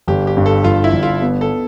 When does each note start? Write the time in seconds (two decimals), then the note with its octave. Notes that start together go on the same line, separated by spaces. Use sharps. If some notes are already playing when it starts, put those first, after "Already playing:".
0.08 G1 G4
0.27 G4
0.37 G2
0.46 A4
0.64 G1 F4
0.84 E4
0.93 G1
1.03 F4
1.22 B3
1.41 A4